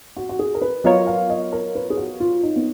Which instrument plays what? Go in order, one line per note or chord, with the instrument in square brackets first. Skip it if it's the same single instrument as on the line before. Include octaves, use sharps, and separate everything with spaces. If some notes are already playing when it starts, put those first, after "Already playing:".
[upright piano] F#4
F#4
G#4
A#4
B4
[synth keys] F#3 B3 F4 A#4 C#5 [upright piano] D#5
[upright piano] F5
D#5
A#4
B4
G#4
F#4
F4
D#4
B3